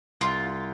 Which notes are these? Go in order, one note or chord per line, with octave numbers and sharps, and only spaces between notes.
C2 F4